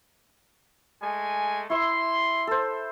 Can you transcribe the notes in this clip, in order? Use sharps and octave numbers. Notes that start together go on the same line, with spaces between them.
G#3 A3 G#5
E4 E5 C6
A4 C5